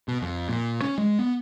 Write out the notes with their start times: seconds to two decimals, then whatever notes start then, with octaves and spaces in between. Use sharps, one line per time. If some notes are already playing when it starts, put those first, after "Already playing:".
0.08 B2
0.22 F2
0.49 A#2
0.82 C#4
0.98 G#3
1.19 B3